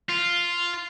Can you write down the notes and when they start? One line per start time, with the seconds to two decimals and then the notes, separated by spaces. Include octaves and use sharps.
0.09 F4